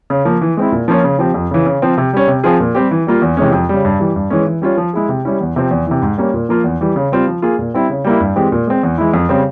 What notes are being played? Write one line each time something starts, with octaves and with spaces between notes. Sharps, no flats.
C#3
F3 A#3
E3
G#3 C4 E4
A#2
F3 A#3 C#4 F4
C#3
F3 C4 G4
F2
C#3 E3
C#3
F3 C4
C3
G3 C#4
C3
F3 C4 F4 G#4
A#2
G3 C4 G4
E3
G3 A#3 F4
E2
C3 E3 G#3 C#4
F2
C#3 G3
G2
E3 G3
G2
E3 G#3 C#4
E3
G3 C#4 F4
F3
G#3 E4 G#4
C3
G3 C#4 E4
E2
C3 F3 C4
E2
C3 E3
G#2
G3 A#3 C#4
A#2
F3 A#3 F4
E2
E3 G3
C#3
G3 C4 F4
F3
A#3 F4 G#4
A#2
G3 C4 E4
C#3
G3 A#3 E4
G2
E3 G#3 C4 G4
A#2
G#3 C4
E2
E3 G#3 E4
F2
C#3 G3 C4